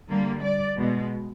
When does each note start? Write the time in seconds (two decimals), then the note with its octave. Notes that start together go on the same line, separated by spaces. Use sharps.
0.10 D3 G3 A#3
0.43 D5
0.78 B2 G#3